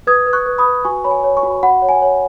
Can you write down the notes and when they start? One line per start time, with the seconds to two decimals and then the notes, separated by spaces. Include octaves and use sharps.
0.07 B4 D#6 G#6
0.26 B4
0.33 C#6 F#6
0.46 B4
0.58 B5 D#6
0.65 B4
0.85 F#4 G#5 C#6
1.04 C#5 B5
1.11 G#5
1.24 C#5
1.37 G#5 C#6
1.43 F#4
1.63 F#4 F#5 B5
1.82 C#5
1.89 G#5
2.02 C#5